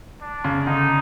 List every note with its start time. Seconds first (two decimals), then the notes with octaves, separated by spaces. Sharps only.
0.21 D4
0.44 C#3
0.66 D3 D#4